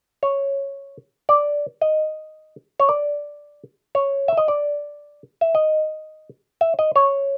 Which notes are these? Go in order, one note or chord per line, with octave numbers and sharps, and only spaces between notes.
C#5
D5
D#5
C#5
D5
C#5
E5
D#5
D5
E5
D#5
E5
D#5
C#5